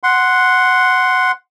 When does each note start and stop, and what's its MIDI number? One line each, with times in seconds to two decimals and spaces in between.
0.03 1.32 78
0.03 1.32 84